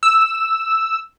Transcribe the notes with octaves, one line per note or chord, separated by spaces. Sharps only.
E6